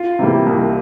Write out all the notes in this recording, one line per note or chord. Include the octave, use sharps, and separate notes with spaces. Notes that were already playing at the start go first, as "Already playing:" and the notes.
Already playing: F4
C3 E3 G3 A#3
C2